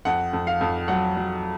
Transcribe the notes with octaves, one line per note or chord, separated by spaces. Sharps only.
F2 F#5
F2
F5
F2
F#3 F#5
F#3